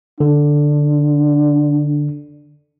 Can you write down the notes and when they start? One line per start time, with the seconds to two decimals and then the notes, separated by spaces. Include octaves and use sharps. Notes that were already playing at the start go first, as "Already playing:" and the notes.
0.20 D3 D4